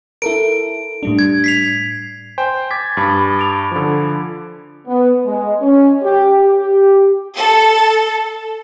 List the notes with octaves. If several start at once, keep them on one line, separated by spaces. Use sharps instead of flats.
E4 A4 A#4 D7
A2 G3 D4
G#6
B6 C7 F7
C5 G5 G#5
D6 G#6 A6 B6
G2 B5
D6 D7 F7
D3 F3
B3
G#3
C#4
G4
G4
A4